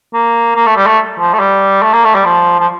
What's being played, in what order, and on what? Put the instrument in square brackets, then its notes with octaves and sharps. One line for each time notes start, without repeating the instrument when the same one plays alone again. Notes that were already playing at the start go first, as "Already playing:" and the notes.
[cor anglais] A#3
A#3
A3
G3
A3
F3
A3
G3
A3
A#3
A3
G3
F3
F3